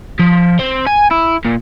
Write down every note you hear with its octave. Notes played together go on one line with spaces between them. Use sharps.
F3
C4
G#5
E4
A#2